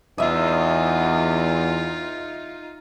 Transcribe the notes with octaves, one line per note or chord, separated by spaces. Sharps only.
E2 D#4 F4 D#5 E5